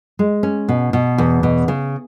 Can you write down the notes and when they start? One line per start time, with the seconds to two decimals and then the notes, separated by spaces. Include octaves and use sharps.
0.19 G#3
0.43 C#4
0.69 B2
0.93 B2
1.18 E2
1.43 B2
1.68 C#3